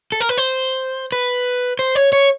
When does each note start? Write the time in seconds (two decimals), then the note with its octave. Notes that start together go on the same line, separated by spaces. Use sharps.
0.12 A4
0.20 A#4
0.29 B4
0.38 C5
1.12 B4
1.79 C5
1.95 C#5
2.13 C#5